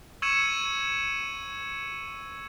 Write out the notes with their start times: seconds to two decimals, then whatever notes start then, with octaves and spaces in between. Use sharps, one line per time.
0.22 C#6 E6 G#6 C#7 D#7 E7